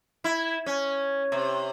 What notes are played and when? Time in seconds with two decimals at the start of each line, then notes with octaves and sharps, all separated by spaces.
0.24 E4
0.66 C#4
1.32 C3